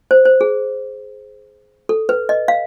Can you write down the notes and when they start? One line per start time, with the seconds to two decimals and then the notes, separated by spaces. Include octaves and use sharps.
0.11 C5
0.25 C5
0.41 G#4
1.89 A4
2.09 B4
2.29 D#5
2.48 F5